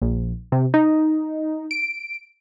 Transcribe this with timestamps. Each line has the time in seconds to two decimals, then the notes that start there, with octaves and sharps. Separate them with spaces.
0.02 A#1
0.52 C3
0.74 D#4
1.71 D7